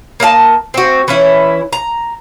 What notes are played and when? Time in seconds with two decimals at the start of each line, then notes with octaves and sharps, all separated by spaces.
0.20 A#3 D#5 F5 A5
0.74 C4 F#4
1.08 E3 C#4 E4
1.73 A#5